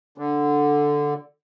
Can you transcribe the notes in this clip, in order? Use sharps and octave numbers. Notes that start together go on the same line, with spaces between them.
D3